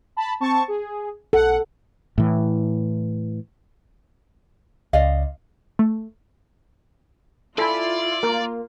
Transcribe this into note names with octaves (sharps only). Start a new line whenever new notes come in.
A5 B5
C4 A5 C#6
G#4
B1 A4 F#5
A2 E3
C#2 D5 D#5 F5
A3
E4 F4 A4 D5 G#5 B5
A#3 A#4